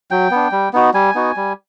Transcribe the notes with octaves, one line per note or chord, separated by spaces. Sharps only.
F#3 G5
B3 D4
G3
B3 D#4 F#4
G3 G#5
B3 D#4 F#4
G3